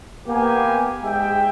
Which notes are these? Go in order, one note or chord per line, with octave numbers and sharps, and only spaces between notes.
A#3 B3 G4 G#5
G#2 G#3 G4 G#4 E5 G5